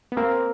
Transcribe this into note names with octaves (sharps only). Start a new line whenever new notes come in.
B3
A#3 C4 A#4